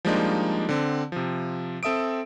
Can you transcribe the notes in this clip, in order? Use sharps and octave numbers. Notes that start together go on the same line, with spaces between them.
F3 G3 G#3 A#3 D4 D#4
D3 C4
C3 F3
C4 A4 E5 D#6 D7